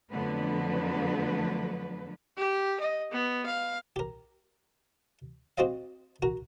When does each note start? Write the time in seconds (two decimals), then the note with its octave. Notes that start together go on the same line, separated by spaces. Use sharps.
0.12 F2 D3 F#3 A3 B3 B4
2.37 G4
2.80 D#5
3.12 B3
3.46 F5
3.96 G4 A#4
5.58 C4 F#4 G4 C5 D#5 F5
6.22 F#4 A#4